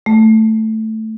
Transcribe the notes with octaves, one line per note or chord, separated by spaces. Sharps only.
A3